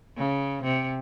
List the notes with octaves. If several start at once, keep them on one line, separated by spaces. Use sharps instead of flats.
C#3
C3